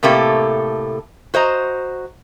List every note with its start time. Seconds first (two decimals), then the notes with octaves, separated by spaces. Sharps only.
0.03 A2 C3 A3 A#3 G4 A4
1.34 F#4 C5 D#5 A#5